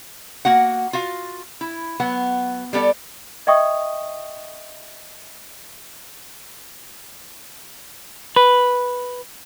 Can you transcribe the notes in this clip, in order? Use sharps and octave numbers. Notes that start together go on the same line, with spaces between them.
A#3 F#4 F#5
F4 F#4 F5
E4
F#3 B3 F#5
G3 B3 A4 D5
D#5 E5 G5 C#6 D#6
B4